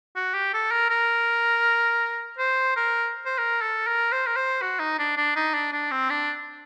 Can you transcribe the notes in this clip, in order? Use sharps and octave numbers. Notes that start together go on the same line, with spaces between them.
F#4
G4
A4
A#4
A#4
C5
A#4
C5
A#4
A4
A#4
C5
A#4
C5
F#4
D#4
D4
D4
D#4
D4
D4
C4
D4